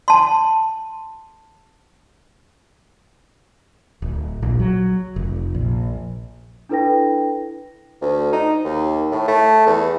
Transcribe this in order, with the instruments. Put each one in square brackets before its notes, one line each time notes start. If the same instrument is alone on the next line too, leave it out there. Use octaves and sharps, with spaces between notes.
[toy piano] A5 C6
[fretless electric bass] D1
A#1
F#3
F1
A#1
[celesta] D4 E4 A4 B4 G5 A#6
[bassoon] D2
D#4
D#2
A2
A3
E2